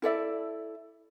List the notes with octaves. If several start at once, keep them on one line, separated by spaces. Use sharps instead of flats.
E4 A4 D5 E5